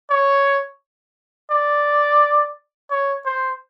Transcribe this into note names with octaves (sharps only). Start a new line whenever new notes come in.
C#5
D5
C#5
C5